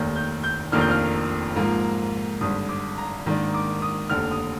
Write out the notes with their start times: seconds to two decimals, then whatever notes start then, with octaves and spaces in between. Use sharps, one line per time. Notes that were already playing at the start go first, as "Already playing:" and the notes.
Already playing: F1 D#2 D#3 G6
0.16 G6
0.44 G6
0.71 F1 F2 D#3 A#3 D4 F6
0.81 G6
0.91 F6
1.56 G#2 F3 A#3
2.41 G#1 G2 D3 D#6
2.69 D6
2.98 A#5
3.26 G#2 D#3 A#3 D4
3.54 D6
3.82 D#6
4.10 F1 D#2 D3 F6
4.31 D#6